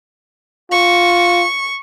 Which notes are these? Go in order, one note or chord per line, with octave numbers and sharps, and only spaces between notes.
F4 C#6